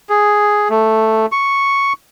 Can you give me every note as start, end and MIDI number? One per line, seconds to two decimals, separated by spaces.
0.09 0.68 68
0.69 1.26 57
1.32 1.93 85